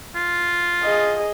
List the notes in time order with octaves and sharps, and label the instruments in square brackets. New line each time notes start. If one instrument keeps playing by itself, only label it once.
[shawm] F4
[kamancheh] G#4 D#5